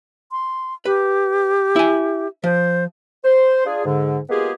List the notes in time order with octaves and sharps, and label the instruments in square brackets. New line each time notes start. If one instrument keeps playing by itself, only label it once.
[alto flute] C6
[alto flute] G4 [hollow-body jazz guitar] B4
[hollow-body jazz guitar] E4 G#5
[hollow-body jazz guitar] F3 [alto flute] C5
[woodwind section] C5
D4 F4 G#4
G#2 D3
G#3 A#3 B3 F4 G4 G#4